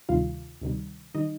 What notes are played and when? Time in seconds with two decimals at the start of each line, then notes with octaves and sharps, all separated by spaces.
0.09 D2 C3 D#3 G3 F4 F5
0.62 D2 C3 D#3 G3
1.14 D#3 G3 D#4 D#5